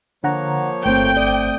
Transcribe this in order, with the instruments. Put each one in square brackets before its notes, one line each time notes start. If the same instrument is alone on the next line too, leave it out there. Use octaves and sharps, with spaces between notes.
[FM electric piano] D3 F#5 A#5 [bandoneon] F3 A#3 C#5
[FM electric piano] G1 C5 [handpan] A3 C4 [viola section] G5
[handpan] D5 [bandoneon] D#6